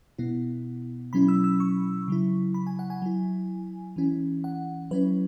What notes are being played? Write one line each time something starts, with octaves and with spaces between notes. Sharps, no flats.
B2 B3 E4
B2 F#3 C#4 E4 B5
E6
E6
C#6
C#3 F#3 E4
B5
G#5
F#5
G#5
F#3 E4
E3 C#4 E4
F#5
F#3 C#4 E4 B4